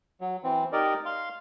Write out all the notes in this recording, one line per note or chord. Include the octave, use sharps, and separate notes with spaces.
F#3
E3 C4
D#4 G4 A#4 D5 D#5
F5 C6